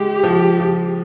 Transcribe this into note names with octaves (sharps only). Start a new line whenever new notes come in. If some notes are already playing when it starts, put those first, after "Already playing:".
Already playing: G#3 G4
F3
F3